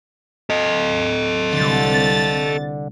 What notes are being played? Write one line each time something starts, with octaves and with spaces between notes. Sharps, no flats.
A4 D#5
C2 D3 A6